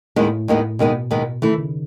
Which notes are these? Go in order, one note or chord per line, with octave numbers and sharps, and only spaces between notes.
D#2 A2 D#3 G#3 B3
D#2 D#3 G#3 B3
D#2 B2 D#3 G#3 B3
D#2 D#3 G#3 B3
D#3 E3 A3 E4
C#3